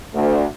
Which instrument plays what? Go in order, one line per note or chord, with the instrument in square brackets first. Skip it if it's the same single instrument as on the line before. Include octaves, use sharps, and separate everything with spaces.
[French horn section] D2